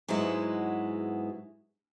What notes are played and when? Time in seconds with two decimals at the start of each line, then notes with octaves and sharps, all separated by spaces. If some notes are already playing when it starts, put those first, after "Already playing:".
0.08 G#2 F#3 G#3 B3 E4 F#4